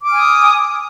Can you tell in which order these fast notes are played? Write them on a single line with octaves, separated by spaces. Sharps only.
D6 F6 G#5 D#6